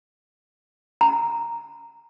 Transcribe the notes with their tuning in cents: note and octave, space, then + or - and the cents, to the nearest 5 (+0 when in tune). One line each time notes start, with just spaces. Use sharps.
A#5 -5